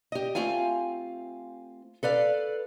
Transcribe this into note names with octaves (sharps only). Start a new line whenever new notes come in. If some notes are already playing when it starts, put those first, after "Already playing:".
G4 D#5
A3 C4 F4 F5 G#5
A4 B4 D5 F5